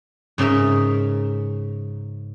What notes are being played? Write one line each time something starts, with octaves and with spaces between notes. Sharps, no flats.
G#2 C#3 C#4 A#4 E5